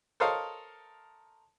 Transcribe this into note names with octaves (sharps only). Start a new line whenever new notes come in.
A4 A#4 C5 C#5 D#5 F5